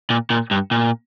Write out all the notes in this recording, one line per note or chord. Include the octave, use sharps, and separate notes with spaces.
A#2
A#2
G2
A#2